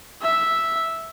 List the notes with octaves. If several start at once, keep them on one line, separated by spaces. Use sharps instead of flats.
E5